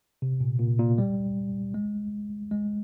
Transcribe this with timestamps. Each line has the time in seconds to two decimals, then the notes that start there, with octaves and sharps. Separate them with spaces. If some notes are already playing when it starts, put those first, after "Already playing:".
0.22 C3
0.40 A#2
0.59 A#2
0.79 A#2
0.98 G3
1.74 G#3
2.51 G#3